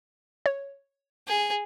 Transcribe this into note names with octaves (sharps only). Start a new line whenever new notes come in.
C#5
G#4